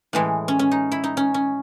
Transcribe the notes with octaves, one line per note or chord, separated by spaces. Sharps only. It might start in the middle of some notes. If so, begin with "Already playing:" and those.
A2 E3 G#3
C#4
C#4
D#4
E4
D#4
C#4
C#4